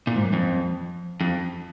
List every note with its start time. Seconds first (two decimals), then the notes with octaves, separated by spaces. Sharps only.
0.07 A#2
0.16 G#2
0.24 F#2
0.33 F2
1.21 F2